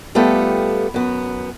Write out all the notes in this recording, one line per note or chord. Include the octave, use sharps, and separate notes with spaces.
G3 A3 B3 F4 G4 A4
F#2 B3